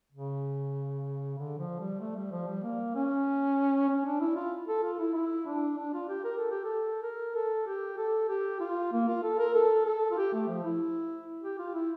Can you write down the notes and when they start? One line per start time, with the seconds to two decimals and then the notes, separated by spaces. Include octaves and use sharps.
0.12 C#3
1.38 D3
1.58 F3
1.80 G3
2.00 A3
2.16 G3
2.32 F3
2.47 G3
2.63 A#3
2.95 C#4
3.89 C#4
4.05 D4
4.20 E4
4.36 F4
4.67 A4
4.83 F4
4.99 E4
5.14 E4
5.46 D4
5.77 D4
5.94 F4
6.09 G4
6.24 A#4
6.37 A4
6.51 G4
6.64 A4
7.03 A#4
7.35 A4
7.67 G4
7.97 A4
8.29 G4
8.60 F4
8.92 A#3
9.08 F4
9.23 A4
9.39 A#4
9.54 A4
9.86 A4
10.11 F4
10.18 G4
10.33 A3
10.48 F3
10.64 E4
11.43 G4
11.58 F4
11.74 E4